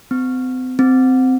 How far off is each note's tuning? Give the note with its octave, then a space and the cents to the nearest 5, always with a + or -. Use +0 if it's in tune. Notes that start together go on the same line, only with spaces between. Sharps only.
C4 -40
C4 -15